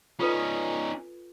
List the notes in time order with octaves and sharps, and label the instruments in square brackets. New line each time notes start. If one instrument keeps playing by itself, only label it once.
[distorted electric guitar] C#4 D#4 [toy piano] F4 A4 B4